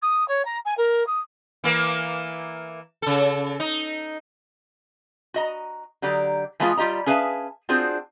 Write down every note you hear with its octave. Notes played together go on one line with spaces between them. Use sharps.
D#6
C#5
A#5
G#5
A#4
D#6
E3 A#3
C#3 A4
D#4
F#4 D#5 A#5
D3 F#3 G4 D5 A#5
E3 F3 G#3 B3 E4 F4
G3 F4 G4 D#5 A#5
C#4 G#4 B4 E5 F5 A5
C4 D4 F4 F#4 G#4 C5